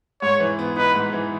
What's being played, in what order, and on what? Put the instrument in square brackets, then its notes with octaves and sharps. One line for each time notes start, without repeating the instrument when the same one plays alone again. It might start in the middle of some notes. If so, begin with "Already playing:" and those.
[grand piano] G#2 [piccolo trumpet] C#5
[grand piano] E3
B3
[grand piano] D#4 [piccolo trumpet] B4
[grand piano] G#2
E3